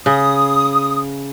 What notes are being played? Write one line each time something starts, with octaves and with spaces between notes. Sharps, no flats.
C#3 D#6